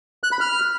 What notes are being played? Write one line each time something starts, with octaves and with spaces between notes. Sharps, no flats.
F#6
B5
F6